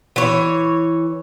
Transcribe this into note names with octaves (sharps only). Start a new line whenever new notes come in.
E3 C#5